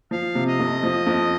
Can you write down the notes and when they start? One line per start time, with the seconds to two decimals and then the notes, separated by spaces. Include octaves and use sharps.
0.11 F3 F5
0.35 C3
0.47 D#5
0.59 F2
0.83 F3
1.06 F2